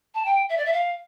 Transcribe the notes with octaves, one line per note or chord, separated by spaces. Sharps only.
A5
G5
E5
D5
E5
F5